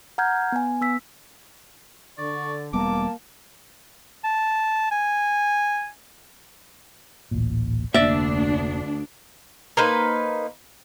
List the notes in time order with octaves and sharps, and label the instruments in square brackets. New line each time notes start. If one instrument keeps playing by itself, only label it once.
[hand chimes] F#5 A#5 F6 G6 G#6
B3 G#5
B3 E6 B6
[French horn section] D3 [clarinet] D5 [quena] C#6
[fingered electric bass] E1 G3 B3 [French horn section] A#3 [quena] A5 [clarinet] D6
[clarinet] A5
G#5
[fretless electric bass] D1 A1 A#2
[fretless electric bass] F1 A#3 [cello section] D2 D4 [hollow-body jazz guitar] D5 E5
[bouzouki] A#3 D#4 B4 C5